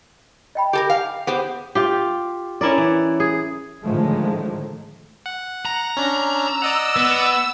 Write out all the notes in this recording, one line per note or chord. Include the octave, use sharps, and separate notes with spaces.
D#5 G5 B5
G4 A4 A#4 G5
F5 F#5 G#5
B3 G4 G#4 C5
F4 G4
C#4 E4 A#4 D5
E3
G#4
A2 D3 D#3 F3 G#3 A3
F#5
A#5
C#4 D4
E6 E7
D5 D#5 F#5
B3